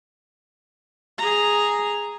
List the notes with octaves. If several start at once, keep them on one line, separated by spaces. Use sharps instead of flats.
G#4 A#5